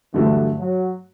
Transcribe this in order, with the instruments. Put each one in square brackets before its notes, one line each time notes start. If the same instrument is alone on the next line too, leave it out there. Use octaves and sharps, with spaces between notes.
[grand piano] G2 D3 F#3 A3 [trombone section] E3
[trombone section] F#3